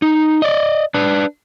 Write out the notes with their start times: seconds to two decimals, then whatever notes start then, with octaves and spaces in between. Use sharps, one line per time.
0.02 D#4
0.42 D5 D#5
0.94 D4 B4